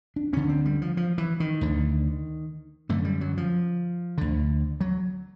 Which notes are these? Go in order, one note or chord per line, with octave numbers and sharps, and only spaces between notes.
D4
D2 D3 C#4
C4
G3
F3
F3
E3
D#3
D2 D3
F#2 D3 A3
G3
F#3
F3
D2 D3
F#3